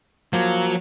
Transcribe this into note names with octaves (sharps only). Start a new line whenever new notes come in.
F3 F#3 A#3